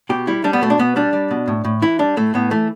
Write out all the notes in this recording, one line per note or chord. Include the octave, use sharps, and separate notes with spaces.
B2 G4
G3 E4
G3 D4
B3
B2 A3
D4
B2 B3
G3 D4
G3
B2
A2
A2
E3 E4
G3 D4
A2 A3
A2 B3
E3 A3